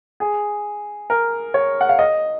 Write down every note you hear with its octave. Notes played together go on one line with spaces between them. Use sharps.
G#4
A#4
C#5
F#5
F5
D#5